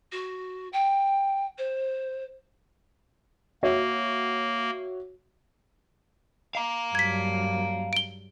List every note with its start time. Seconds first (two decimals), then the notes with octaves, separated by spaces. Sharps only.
0.12 F#4
0.73 G5
1.58 C5
3.63 A#3 F#4 C#5 E5
6.55 F5 A#5
6.95 G2 F#3 G#6 B6
7.93 D7 G7